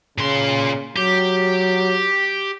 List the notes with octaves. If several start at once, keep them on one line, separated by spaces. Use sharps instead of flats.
A#2 C#3 C6
F#3 G4